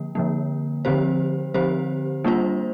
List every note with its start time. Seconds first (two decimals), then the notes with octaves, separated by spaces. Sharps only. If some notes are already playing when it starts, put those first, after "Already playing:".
Already playing: D3 F3 A#3
0.15 D3 F3 A#3
0.85 D3 F3 C4 G4 C5
1.54 D3 F3 C4 G4 C5
2.24 G3 A#3 D4 F4 C5